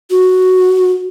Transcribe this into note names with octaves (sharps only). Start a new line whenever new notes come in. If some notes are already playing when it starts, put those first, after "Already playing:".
F#4